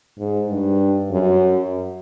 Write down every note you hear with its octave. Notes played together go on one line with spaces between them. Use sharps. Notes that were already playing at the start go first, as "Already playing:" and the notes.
G#2
G2
F#2